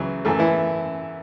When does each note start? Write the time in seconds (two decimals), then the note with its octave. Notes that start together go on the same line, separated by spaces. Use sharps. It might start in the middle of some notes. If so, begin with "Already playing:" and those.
Already playing: C#2 C#3 E3 F#3 E4
0.25 F#2 E3 A3 A4
0.39 E3 E4